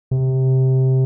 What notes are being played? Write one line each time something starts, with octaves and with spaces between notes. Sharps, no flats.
C3